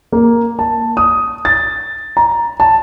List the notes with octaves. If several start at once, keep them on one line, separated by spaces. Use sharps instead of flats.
A#3
A5
D#6
A6
A#5
A5